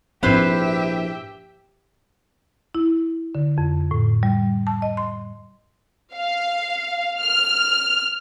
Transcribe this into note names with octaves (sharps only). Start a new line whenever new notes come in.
A#1 G#2 C4 E4 G4 B4 C5 E5
E4
D3
F2
A2
G3
A5
D#5
C6
F5
F6